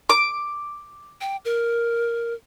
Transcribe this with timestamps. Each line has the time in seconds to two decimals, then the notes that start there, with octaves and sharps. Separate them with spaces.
0.10 D6
1.21 G5
1.45 A#4